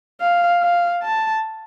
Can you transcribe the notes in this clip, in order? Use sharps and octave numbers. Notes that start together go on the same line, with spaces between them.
F5
F5
A5